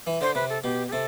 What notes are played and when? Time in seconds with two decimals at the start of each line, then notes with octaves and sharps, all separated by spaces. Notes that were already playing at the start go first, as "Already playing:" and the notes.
0.07 E3
0.21 D3 C5
0.35 C3 B4
0.49 A4
0.64 B2 G4
0.88 G4
0.92 C3 A4